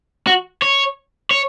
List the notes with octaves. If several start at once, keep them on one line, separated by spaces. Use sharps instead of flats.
F#4
C#5
C#5